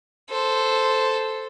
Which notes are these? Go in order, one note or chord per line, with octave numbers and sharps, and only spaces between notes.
A4 C5